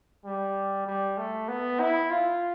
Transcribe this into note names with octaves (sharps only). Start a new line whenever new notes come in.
G3
G3
A3
B3
E4
F4